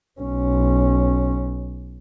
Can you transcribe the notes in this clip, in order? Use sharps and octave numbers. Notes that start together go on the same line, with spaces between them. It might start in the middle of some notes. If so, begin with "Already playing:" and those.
B1 C#4